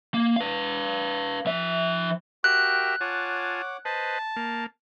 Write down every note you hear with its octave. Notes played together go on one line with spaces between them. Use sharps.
A#3
B4 F5
F3 E5
F#4 G4 A#4 E5 G5 F#6
F4 C#5 F#5 G#5 A5 D6
B4 C5 D#5 A5
A#3